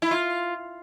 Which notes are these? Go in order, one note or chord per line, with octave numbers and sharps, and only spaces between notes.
E4
F4